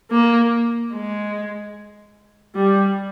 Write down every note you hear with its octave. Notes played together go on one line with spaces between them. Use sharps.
A#3
G#3
G3